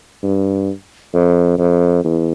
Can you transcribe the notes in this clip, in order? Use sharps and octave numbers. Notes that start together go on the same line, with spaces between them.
G2
F2
F2
E2